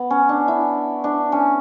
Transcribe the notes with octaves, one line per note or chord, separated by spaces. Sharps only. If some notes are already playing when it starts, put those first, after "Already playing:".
Already playing: B3
C#4
D4
E4
D4
C#4